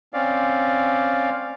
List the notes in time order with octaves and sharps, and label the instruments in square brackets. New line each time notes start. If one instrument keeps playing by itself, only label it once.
[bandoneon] C4 C#4 D5 F5